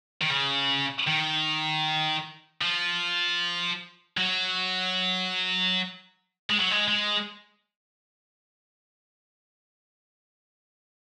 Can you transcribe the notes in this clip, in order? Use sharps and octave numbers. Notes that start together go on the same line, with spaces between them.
D#3
C#3
D#3
F3
F#3
G#3
F#3
G#3
G#3